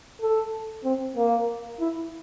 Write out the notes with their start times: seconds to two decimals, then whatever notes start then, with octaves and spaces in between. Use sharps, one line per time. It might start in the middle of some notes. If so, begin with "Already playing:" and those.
0.21 A4
0.84 C4
1.16 A#3
1.80 E4